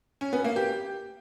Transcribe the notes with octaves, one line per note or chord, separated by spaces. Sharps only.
C#4
B3
A#3
G4